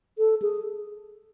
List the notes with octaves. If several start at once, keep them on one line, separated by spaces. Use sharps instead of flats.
A4
G#4